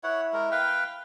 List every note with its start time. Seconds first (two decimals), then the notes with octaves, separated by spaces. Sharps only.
0.03 E4 C#5 F#5
0.33 G#3 A#4
0.51 B4 F5 G5